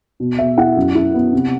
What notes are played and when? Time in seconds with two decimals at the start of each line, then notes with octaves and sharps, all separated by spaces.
0.20 B2
0.38 B2 E5
0.58 E4 F#5
0.77 F#2
0.95 E4
1.14 B3
1.33 C3